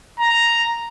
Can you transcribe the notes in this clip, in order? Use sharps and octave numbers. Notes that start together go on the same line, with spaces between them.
A#5